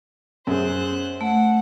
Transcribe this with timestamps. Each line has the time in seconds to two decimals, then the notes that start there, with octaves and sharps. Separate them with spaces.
0.47 F#2 G#4 C5 F#6
1.21 A3 F#5